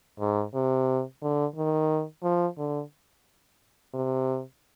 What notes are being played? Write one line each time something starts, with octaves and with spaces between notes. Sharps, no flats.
G#2
C3
D3
D#3
F3
D3
C3